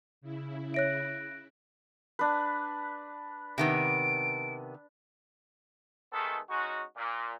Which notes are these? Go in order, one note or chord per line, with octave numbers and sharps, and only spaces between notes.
C#3 E4
C#5 E5 F#6 A#6 D7
D4 B4
C3 D#3 B3 D7
D#3 G#3 A3 B3 G#4 A4
G#3 C#4 D#4 F#4
A#2